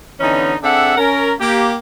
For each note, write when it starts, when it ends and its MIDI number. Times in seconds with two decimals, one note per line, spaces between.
0.20 0.55 50
0.20 0.55 52
0.20 0.55 59
0.20 0.55 61
0.20 0.55 63
0.63 0.97 60
0.63 0.97 62
0.63 0.97 68
0.63 0.97 69
0.63 0.97 76
0.63 0.97 78
0.98 1.34 61
0.98 1.34 70
1.39 1.75 58
1.39 1.75 67